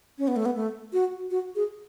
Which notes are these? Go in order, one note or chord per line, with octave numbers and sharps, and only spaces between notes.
C#4
B3
A3
B3
A3
F#4
F#4
G#4